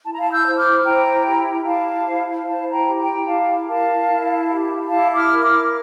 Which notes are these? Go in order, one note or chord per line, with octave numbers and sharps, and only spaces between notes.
E4 A5
A#5
F5 A5
E6 G6
C5
D6 F6
E4 G5 A#5
G4
E4 F5 A5
C5
E4 F5 A5
G5 A#5
G4
G5 A#5
E4 F5 A5
A#4 F5 A5
E4
G4
E4 F5 A5
D6 F6
A#4
D6 F6